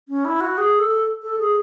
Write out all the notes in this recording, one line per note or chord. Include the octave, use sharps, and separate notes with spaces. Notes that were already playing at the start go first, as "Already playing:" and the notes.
C#4
E4
F#4
G#4
A4
A4
G#4